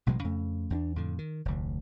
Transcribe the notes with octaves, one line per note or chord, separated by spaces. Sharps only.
A1 B2 F#3 G#3
F2 C#3 A3
E2 C#4 D4
F2 A2 D3
D#3
F1 D2